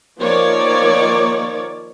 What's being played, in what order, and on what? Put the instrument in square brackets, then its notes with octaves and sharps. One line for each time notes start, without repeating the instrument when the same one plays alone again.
[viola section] D#3 F3 A#3 C#5 D5